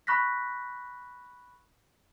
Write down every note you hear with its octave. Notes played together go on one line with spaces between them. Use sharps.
B5 C#6 F#6 A#6 B6